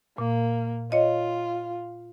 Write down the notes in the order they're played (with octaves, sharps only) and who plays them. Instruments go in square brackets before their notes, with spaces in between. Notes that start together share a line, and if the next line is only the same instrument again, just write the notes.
[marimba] A#2 [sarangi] A#3
[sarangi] F4 [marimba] C#5 D#5